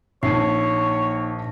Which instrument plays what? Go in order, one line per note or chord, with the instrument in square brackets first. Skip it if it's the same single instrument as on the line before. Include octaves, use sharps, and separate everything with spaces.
[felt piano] A#1 A5 [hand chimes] A#3 D#4 C7 [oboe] C#5